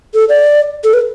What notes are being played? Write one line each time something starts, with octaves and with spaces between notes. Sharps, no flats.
A4
D5
A4
B4